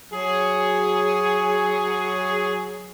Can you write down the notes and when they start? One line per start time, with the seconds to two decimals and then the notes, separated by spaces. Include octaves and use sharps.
0.12 F#3 G#4